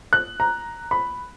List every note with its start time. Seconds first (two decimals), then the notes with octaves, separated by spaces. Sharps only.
0.13 F#6
0.40 A#5
0.91 B5